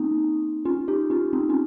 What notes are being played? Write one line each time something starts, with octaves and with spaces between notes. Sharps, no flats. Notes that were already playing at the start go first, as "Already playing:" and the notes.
Already playing: A#3 C4 C#4 D#4
C#4 F4
D#4 G4
C#4 F4
C4 D#4
C#4 F4